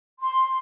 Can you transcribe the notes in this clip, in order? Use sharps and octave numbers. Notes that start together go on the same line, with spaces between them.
C6